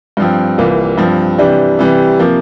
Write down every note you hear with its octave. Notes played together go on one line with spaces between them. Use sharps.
G2 F3 C4
C2 C3 E3 A#3 F4
G2 F3 C4
C3 E3 G3 D4
C3 E3 G3
C3 F3 A#3